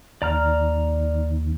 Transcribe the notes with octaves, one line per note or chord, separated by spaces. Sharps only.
D#2 D5 A#5 F6